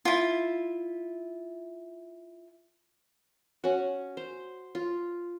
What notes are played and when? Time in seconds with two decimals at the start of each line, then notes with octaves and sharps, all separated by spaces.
0.05 E4 F4
3.64 C#4 F#4
4.17 C5
4.75 F4